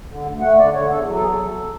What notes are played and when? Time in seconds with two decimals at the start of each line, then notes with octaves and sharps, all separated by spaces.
0.10 D3
0.26 D2
0.41 A3 F#5
0.58 D3 D5
0.74 D3 C#5
0.90 E2 A4
1.07 F#3
1.15 A4
1.21 E2 G#4
1.27 A4
1.39 E2